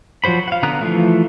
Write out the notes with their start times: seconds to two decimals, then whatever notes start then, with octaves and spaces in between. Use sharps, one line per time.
0.24 F3 F#3 F#4 C5 B5
0.48 F5 F#5
0.63 D3 B3 A#5 D#6 F#6
0.81 E3 F3 A3